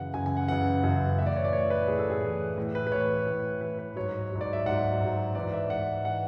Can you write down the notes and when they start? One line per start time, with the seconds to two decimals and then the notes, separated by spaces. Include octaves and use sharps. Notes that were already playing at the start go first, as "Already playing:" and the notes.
Already playing: F#2 C#3 E3 F#5
0.14 F#2 C#3 E3 G#5
0.26 G#5
0.37 F#5
0.48 F#2 C#3 E3 F#5
0.83 F#2 C#3 E3
1.19 A2 E3 E5
1.26 D5
1.36 C#5
1.44 D5
1.53 A2 E3 C#5
1.70 B4
1.88 A2 E3 G#4
1.99 A4
2.10 G#4
2.22 A2 E3
2.57 A2 E3
2.75 B4
2.87 B4
2.92 A2 E3 C#5
3.26 A2 E3
3.61 A2 E3 B4
3.79 B4
3.96 G#2 F#3 C#5
4.32 G#2 F#3
4.41 D5
4.53 E5
4.66 G#2 F#3 F#5
5.01 G#2 F#3
5.35 G#2 E3 D5
5.53 E5
5.70 G#2 E3 F#5
6.05 E3 F#5